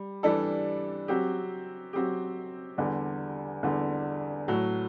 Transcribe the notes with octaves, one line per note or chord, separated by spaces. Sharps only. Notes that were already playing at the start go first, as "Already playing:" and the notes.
Already playing: G3
E3 G3 D4 A4
F#3 C4 G4
F#3 C4 G4
E2 D3 G3
E2 D3 G3
A2 F#3 A3